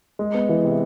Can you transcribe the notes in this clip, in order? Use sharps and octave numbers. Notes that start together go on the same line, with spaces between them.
G#3
B3
E3
C3